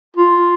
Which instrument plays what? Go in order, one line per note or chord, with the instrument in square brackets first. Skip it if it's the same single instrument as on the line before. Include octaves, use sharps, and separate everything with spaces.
[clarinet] F4